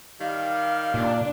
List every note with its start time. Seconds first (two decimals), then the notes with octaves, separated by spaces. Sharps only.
0.21 D#3 G3 F5
0.94 A#2 D4